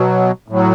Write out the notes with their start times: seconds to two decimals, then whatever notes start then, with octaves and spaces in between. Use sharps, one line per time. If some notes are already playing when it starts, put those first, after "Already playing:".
Already playing: B2 F#3
0.48 A2 F#3